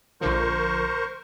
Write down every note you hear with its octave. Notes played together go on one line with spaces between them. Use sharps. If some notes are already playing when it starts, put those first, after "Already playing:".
A#1 D3 F3 A#4 C5 C#6